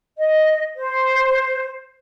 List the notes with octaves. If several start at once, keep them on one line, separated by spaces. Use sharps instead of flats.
D#5
C5